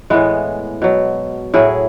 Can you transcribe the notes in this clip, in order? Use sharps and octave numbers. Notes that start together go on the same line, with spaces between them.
A2 E3 G#3 B3
B2 F#3
A2 F#3 E4 G#4